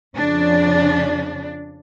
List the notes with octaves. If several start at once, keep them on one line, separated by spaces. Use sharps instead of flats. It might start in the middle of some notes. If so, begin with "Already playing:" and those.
F2 C#3 F3 D4